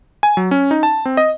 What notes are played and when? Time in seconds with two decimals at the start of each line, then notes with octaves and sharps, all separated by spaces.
0.23 G#5
0.37 F#3
0.51 C#4
0.71 D#4
0.83 A5
1.06 C4
1.17 D#5